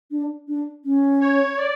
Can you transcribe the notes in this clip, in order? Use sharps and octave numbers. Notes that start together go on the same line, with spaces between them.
D4
D4
C#4
C#5
D5